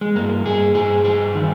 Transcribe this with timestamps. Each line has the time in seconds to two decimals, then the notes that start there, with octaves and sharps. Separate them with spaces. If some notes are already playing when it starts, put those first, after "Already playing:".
0.01 G#3
0.15 G2 A#3
0.45 G2 G#4
0.75 G2 G#4
1.04 G2 G#4
1.35 D#3